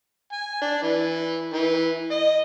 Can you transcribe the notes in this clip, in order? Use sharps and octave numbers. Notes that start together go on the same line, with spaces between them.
G#5
D4
E3
E3
D#5